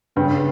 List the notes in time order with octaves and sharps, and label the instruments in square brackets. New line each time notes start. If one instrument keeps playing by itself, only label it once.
[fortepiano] G2 [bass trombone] C#3